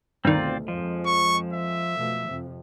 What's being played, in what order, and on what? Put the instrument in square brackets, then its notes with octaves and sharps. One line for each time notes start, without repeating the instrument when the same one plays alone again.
[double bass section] D2 B2 [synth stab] G2 D#3 [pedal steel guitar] C4 F4 D5
[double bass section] F2 G#3 [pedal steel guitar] F3
[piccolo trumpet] C#6
E5
[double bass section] B2 F3 A3
F2 C3 F3